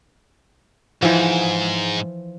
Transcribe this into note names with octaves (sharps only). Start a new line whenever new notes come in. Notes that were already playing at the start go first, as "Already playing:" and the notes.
G#2 E3 F3